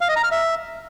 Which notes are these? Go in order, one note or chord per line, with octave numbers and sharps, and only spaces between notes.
F5
D#5
A#5
F6
E5